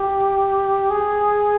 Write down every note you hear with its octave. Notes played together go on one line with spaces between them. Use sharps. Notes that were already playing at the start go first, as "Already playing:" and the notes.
Already playing: G4
G#4